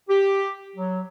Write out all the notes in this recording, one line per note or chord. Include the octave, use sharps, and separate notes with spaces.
G4
F#3